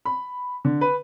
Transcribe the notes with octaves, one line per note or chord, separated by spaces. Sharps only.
B5
D3
B4